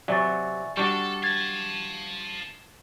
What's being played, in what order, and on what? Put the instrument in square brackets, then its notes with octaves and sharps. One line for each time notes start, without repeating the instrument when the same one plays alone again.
[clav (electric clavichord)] C3 F#3 [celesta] D5 A6 [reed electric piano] E5 G#5 C#6
[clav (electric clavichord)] G3 D4 F#4 [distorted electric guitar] A4 [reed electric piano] C#6
[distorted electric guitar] F5 A5 [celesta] G#6 A6